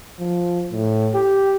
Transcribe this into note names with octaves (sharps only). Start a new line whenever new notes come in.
F3
A2
G4